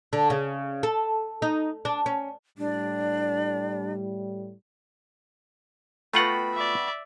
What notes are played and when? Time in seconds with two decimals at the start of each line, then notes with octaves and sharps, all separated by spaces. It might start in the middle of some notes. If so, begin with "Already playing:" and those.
0.13 D3
0.30 C#3
0.83 A4
1.42 D#4
1.85 D4
2.06 C#4
2.58 A2 G3 D4
6.14 A3 B3 F4 F#4 F#5 G5 B5
6.54 D5 E5